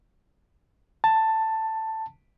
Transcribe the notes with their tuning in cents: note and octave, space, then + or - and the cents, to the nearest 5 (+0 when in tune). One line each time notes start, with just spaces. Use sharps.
A5 +10